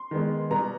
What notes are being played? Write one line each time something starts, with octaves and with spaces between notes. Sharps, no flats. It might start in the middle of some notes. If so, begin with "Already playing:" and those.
Already playing: C6
D#3 G#3 B3
B2 G3 B3 A#5